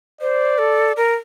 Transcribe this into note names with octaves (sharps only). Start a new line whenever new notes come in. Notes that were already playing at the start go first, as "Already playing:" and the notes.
C5 D5
A4
A#4